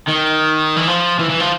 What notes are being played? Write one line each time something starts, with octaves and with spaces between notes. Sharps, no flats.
D#3
E3
F3
E3
E3
F3